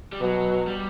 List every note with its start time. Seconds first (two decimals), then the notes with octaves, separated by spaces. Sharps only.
0.13 G3
0.21 B2 F#3
0.67 G3